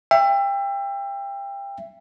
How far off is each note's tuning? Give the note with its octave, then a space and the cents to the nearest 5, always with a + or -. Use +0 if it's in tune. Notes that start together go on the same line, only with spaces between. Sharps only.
E5 +25 G5 +25